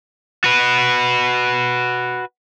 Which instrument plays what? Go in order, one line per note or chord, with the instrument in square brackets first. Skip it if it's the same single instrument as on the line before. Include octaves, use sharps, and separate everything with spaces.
[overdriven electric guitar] F#4 B4